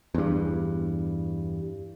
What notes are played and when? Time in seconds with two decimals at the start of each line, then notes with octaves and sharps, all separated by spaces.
0.14 E2 G2